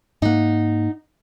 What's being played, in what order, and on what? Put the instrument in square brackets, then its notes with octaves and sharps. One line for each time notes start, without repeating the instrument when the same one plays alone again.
[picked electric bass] G#2 A#3 [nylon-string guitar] D#4 F#5